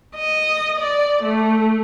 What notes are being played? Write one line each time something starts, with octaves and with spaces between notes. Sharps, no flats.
D#5
D5
A3